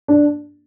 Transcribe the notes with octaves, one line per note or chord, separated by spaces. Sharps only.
D4